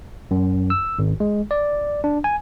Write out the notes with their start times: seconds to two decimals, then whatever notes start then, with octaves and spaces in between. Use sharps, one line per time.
0.31 F#2
0.70 E6
0.99 G#1
1.20 G#3
1.51 D5
2.04 D4
2.24 G#5